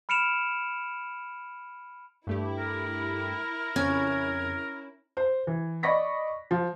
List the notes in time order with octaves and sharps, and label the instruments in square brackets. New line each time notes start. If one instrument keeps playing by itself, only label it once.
[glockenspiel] B5 F6 C#7 D7 E7 F7
[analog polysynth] G2 A3 G4 [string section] E4
[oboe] A#4
[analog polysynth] F2 C#3 G#6 [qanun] C#4
[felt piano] C5
E3
D5 D#5 B5 C#6 A#6 B6
F3